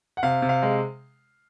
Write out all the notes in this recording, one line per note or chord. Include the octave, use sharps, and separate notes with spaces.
F#5
C3 F5
C3
F5
G#3